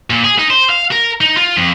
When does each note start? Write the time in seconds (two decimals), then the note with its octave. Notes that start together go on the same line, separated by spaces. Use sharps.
0.10 A#2
0.24 G#4
0.39 D#4
0.50 C5
0.70 F5
0.92 A#4
1.21 D#4
1.37 F4
1.57 F2